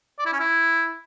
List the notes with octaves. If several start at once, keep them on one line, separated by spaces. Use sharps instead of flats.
D5
E4
C#4
E4